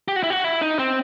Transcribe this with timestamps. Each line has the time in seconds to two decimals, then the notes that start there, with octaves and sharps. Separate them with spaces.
0.08 G4
0.16 F#4
0.23 E4
0.30 F#4
0.44 E4
0.62 D#4
0.79 C4